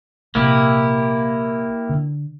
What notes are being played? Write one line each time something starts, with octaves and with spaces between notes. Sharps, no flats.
A#1 C3 A#3 E4 G4
D3